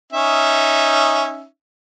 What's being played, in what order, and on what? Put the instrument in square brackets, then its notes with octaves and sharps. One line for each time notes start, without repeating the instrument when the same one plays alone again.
[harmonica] C#4 D#4 E5